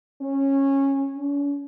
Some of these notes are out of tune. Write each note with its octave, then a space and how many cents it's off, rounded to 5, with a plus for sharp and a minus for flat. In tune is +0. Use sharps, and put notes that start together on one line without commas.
C#4 -15
C#4 +45